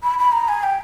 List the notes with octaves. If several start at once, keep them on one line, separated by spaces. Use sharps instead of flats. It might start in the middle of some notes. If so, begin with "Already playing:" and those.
B5
B5
A#5
G#5
G5